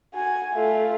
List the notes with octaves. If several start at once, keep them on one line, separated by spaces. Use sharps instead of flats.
F#4 G#5
A3 F4